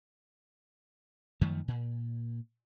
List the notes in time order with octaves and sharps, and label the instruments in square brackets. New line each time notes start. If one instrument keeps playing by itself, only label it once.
[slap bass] F#2 D#3 F3 A3
A#2